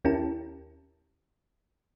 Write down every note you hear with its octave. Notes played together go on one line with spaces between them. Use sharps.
D#2 C#4 E4 G4 A#4 A5